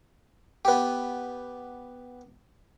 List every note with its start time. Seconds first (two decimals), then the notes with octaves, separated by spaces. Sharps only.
0.65 B3 G4